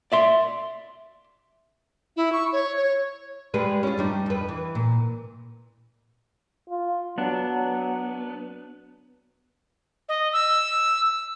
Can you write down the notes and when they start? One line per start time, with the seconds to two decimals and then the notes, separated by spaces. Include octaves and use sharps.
0.12 D5 E5 C6
2.17 E4
2.33 C#6
2.53 C#5
2.76 C#5
3.54 G3 G#3 B4
3.83 C#4 F4
3.98 G2 G3 D#4
4.26 F2 B4
4.49 E3
4.75 A#2
6.69 F4
7.18 F#3 B3 D4
10.09 D#5
10.33 E6